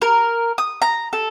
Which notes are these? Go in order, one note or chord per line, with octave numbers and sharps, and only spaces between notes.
A#4
D#6
A#5
A4